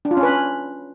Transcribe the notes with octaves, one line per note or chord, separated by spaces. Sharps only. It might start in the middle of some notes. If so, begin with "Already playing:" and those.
D4
F4
C#4
B4
C#4